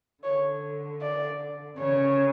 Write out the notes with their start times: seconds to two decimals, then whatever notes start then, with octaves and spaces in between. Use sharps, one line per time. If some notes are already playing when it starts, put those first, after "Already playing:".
0.23 D3 C#5
1.01 D5
1.79 C#3 C#5